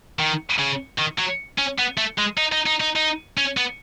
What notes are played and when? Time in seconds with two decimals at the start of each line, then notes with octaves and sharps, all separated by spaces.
0.19 D#3
0.59 C#3
0.99 D#3
1.19 F#3
1.59 C#4
1.79 B3
1.98 A3
2.18 G#3
2.37 D#4
2.52 D#4
2.67 D#4
2.81 D#4
2.96 D#4
3.38 C#4
3.57 B3